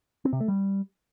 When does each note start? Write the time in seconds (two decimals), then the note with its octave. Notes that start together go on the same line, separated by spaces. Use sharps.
0.25 C4
0.33 C3
0.40 A3
0.48 G3